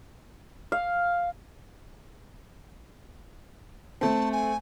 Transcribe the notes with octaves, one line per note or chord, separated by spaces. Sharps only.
F5
A3 C4 A5
G#5